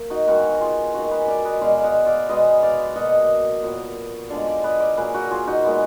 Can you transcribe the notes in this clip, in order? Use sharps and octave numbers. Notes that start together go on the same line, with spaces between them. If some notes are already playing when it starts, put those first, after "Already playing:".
Already playing: A#3
D#4 F#4
D#3 G#3 B3 F#4 A#4
F4 G#4
D#3 A#3 F#4 A#4
G#4 B4
A#4 D5
B4 D#5
B2 G#3 B3 D5 F5
F5
D#5 F#5
D5 F5
B2 G#3 B3 B4 D#5
D5 F5
B2 A#3 D#5 F#5
A#2 F#3 B3
D3 F3 G#3 B3 D5 F5
D5 F5
B4 D#5
A#4 D5
A#2 F#3 A#3 G#4 B4
F#4 A#4
F4 G#4
D#4 F#4
A#2 G#3 B3